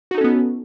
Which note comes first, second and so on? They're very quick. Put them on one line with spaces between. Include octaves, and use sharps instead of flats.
F#4 D#4 A4 C#4 B3